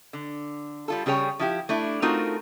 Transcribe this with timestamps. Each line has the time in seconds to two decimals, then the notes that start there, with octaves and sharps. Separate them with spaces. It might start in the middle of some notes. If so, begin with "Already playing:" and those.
0.13 D3
0.88 G3 F4 A4
1.06 C#3 G3 G#4 C#5 G5
1.39 F3 E4 G4
1.69 A3 D4 E4
2.02 A3 C4 D#4 F4 F#4 A#4